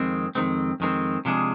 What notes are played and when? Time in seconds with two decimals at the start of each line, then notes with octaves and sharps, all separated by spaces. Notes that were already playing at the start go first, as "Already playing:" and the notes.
Already playing: F2 D#3 G#3 C4
0.35 F2 D#3 G#3 C4
0.80 F2 D#3 G#3 C4
1.25 C3 F3 G#3 D4 G#4